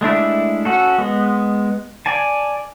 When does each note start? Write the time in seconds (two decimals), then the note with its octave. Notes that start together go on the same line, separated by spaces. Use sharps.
0.01 G#3 A3 D4 E4
0.65 C#4 F#4 A4
0.98 G#3 B3
2.06 D5 G#5 A5